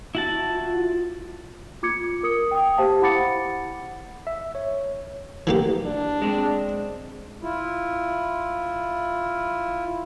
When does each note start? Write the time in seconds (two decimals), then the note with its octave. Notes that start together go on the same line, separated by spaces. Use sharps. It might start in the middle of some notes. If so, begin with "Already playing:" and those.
0.15 E4 F#4 A5
0.50 F4
1.83 F4 D6 G#6 C#7
2.23 A#4 D#6 C#7
2.51 G5 D#6
2.78 G4 C5 F5 A5
3.02 E4 F#5 B5 D6 A6 C#7
4.27 E5
4.55 C#5
5.47 E3 A#3 G4
5.86 D4
6.22 G#3 C4
7.42 E4 F4